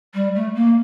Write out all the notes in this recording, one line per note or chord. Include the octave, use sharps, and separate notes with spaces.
G3
A3
A#3